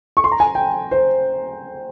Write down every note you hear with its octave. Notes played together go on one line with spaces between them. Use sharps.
C#6
C6
A#5
G#5
G5
C5